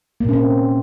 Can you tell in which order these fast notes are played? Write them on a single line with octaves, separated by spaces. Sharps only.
A#3 A#2 C#4 C4